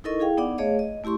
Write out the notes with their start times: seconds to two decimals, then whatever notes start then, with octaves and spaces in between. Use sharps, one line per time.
0.04 D#4 E4 A4 A#4 D#5 C#6
0.19 E4 G#4 F5 G5
0.37 B3 D#4 D5 F#5 D6
0.58 A3 G#4 C#5 D#5 F5
0.79 D#5
1.04 A3 E4 G4 C6 C#6